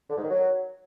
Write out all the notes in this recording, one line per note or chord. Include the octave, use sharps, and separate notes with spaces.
D3
G#2
D#3
F#3